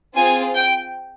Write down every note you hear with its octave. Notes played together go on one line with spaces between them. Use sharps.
C4 F4 G#4 G#5
G5